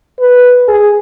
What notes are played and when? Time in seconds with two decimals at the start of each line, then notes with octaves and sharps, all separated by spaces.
0.20 B4
0.68 G#4